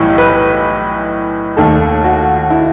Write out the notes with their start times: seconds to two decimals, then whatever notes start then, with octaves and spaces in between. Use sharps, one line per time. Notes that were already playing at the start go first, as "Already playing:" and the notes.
Already playing: B1 A2 E3 G3
0.18 B4
1.57 D#2 D#3 A3 A4
2.04 F#4
2.50 E4